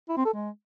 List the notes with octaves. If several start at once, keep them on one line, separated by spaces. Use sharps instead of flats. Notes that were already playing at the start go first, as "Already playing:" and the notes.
E4
C4
A4
G#3